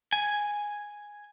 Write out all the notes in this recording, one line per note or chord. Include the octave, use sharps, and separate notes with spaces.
G#5